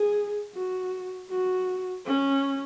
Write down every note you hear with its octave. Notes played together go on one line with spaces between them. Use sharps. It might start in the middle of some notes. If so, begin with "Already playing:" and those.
Already playing: G#4
F#4
F#4
C#4